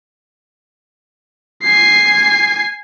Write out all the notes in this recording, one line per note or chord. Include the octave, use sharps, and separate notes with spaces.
G#5 C7